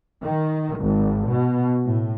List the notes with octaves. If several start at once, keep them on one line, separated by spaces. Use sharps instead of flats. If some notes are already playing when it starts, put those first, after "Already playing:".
D#3
G#1
B2
A2